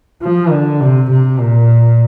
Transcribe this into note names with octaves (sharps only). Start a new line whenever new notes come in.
F3
D3
C3
C3
A#2